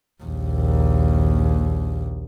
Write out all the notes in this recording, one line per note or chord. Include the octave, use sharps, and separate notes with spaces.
A#1 D#2